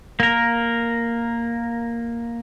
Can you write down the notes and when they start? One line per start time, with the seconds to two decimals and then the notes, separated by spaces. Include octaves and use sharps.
0.20 A#3 A#4